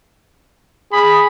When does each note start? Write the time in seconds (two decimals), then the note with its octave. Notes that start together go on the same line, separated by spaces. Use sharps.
0.92 G#4 B5